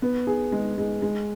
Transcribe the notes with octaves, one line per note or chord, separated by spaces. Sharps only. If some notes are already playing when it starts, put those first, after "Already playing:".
B3
G#4
G#3
G#3
G#3